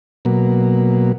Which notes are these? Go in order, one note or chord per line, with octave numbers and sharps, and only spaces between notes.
B2 F#3 A#3